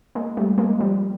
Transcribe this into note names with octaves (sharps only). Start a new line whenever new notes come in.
G#3 A#3
G3 A3
G#3 A#3
F3 G3